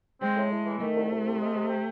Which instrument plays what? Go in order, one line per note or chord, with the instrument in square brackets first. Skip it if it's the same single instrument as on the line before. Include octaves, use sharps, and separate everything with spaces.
[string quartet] G#3 [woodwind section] C4
[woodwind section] A2
A2
E3
[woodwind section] D#3 [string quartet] A3
[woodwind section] C2
C2
C3
G#3
C3
C4